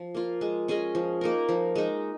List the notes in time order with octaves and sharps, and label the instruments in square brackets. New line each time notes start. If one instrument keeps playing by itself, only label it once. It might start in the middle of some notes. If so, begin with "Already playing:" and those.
Already playing: [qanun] F3
A#3 F4
G#3
C#4 G#4 D#5
F3
A#3 D#4 A#4
F3
G#3 D#4